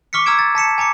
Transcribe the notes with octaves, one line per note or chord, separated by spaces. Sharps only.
C#6 D6 F6 B6 C#7
A#5 E6 F6 G#6 D7 E7
A6
A5 B6 C#7 E7
G#5 A#5 D6 C#7